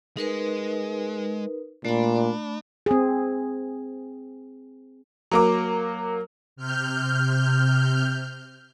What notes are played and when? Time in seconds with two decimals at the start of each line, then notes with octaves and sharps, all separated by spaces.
0.17 G#3 D#4 A#4 B4
1.85 A#2 A3 D4 B5
2.86 C4 G#4
5.31 F#3 A#3 D6
6.56 C3 F6 G6